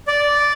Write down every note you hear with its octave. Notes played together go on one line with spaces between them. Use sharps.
D5